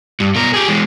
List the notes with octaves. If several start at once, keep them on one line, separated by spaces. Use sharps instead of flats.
G2
B2 A#4
G4 G#4
E3 G#3